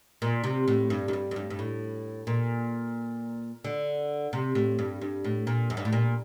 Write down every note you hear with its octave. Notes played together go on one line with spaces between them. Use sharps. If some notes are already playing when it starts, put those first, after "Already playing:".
A#2
C3
A2
G2
F#2
G2
F#2
G2
G2
A2
A#2
D3
C3
A2
G2
G2
A2
A#2
F#2
G2
A2
A#2